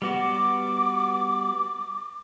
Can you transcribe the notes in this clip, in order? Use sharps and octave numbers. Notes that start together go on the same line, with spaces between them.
G3 B3 F#4 D6